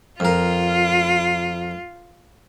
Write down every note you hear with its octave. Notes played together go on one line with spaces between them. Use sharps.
F2 F4 A#4